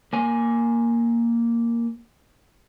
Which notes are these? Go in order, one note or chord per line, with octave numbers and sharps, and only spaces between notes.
A#3 G#5